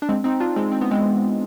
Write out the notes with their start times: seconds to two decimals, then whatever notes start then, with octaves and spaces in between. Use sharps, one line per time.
0.02 D4
0.09 G#3 C4
0.24 C4 D#4
0.40 D4 F4
0.56 G#3 C4
0.72 C4
0.81 B3
0.91 G#3 C4